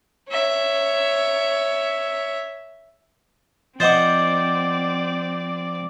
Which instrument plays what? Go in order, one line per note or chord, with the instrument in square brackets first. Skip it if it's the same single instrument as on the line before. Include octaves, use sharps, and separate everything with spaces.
[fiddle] C#5 E5
[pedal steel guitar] F3 [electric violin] C4 D5 [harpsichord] C5 D#5 F#5 [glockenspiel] D6 A6